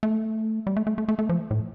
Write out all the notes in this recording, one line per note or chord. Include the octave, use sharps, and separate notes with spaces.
A3
G3
A3
A3
A3
A3
A3
F3
A2